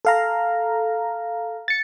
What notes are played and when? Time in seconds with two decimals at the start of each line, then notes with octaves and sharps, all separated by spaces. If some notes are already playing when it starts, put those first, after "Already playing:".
0.05 A4 F5 A#5
1.68 A6 C#7